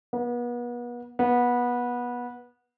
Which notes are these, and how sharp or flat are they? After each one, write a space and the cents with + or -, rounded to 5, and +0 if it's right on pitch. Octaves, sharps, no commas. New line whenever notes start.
B3 -35
B3 -20